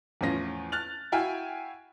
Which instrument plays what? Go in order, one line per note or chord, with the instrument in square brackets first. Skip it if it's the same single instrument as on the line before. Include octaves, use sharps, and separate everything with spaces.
[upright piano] E2 A2 F3 C#4 F4 A#6
F6 F#6 A6 F7
E4 F#4 F5 G5 G#5 F6